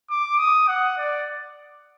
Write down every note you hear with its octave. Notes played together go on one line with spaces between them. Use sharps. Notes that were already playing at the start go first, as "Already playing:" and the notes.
D6
D#6
F#5
D5